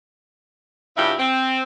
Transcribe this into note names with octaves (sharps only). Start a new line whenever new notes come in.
G2 C#3 E4 F4 G4
C4